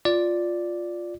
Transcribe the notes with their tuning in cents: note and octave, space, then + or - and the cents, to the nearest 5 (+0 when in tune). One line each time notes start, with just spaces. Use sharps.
F4 +5 D5 +0